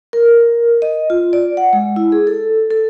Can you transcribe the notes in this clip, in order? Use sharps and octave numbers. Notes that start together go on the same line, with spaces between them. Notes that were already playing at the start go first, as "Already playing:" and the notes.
A#4
D#5
F4
D5
F#5
G#3
E4
G#4
A4
A4